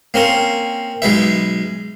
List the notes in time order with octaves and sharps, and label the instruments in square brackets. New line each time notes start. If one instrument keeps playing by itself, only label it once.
[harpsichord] A#3 C4 C#4 A#4
B1 G#3 B4 E5